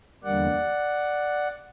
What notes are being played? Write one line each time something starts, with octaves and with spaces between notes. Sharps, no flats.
E2 D3 G3 A#3 D5 F#5